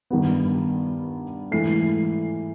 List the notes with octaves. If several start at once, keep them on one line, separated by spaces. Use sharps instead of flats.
G2 D#3 G3 B3
G#2 E3 A3 C7